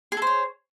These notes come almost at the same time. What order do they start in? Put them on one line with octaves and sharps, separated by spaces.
G#4 A4 C5 C#5